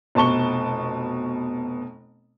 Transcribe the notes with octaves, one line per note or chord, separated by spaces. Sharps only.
F1 B2 A5 C#6 G7